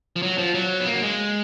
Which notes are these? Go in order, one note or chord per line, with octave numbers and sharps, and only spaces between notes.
F3
F#3
F3
F#3
B3
A#3
F#3
G#3